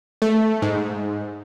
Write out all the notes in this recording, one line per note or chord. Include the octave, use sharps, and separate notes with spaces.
A3
G#2